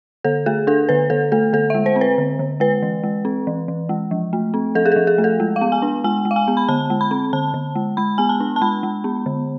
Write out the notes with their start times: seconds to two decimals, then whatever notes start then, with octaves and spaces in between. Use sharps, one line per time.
0.24 D3 A4
0.46 A3 G#4
0.67 D4 A4
0.89 D3 B4
1.10 D3 A4
1.32 A3 A4
1.53 D3 A4
1.70 G#3 E5
1.86 C5
1.96 C4
2.01 B4
2.18 D3
2.39 D3
2.60 G#3 B4
2.82 E3
3.04 G#3
3.25 C4
3.47 E3
3.68 E3
3.89 G#3
4.11 F3
4.33 A3
4.54 C4
4.75 F3 A4
4.86 G#4
4.92 F3 A4
5.07 G#4
5.18 A3
5.24 A4
5.40 G#3
5.56 F5
5.61 B3
5.72 G#5
5.82 D4
6.04 G#3 G#5
6.25 G#3
6.31 F5
6.36 G#5
6.47 B3
6.57 B5
6.68 D3 A5
6.90 G#3
7.01 B5
7.11 C4
7.33 D3 A5
7.54 D3
7.75 G#3
7.97 G#3 B5
8.18 B3 G#5
8.29 A5
8.40 D4
8.56 A5
8.61 G#3 B5
8.83 G#3
9.04 B3
9.26 D3